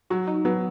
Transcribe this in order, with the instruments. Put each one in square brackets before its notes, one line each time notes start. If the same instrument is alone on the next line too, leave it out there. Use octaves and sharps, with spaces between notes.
[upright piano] F#3 [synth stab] F#4
[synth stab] D#4
[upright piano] F#3 [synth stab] B3